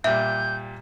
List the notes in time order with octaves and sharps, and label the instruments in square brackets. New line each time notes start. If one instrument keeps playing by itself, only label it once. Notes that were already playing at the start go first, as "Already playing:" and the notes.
[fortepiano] A#2 G3 [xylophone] E5 [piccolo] G6